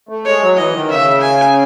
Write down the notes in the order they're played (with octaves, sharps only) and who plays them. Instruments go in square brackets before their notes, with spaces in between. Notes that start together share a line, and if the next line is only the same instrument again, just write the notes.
[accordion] A3
[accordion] G#3 [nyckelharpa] C#5
[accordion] F#3
[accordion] E3 [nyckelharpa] D#5
[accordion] D#3
[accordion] C#3 [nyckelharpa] E5
[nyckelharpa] G#5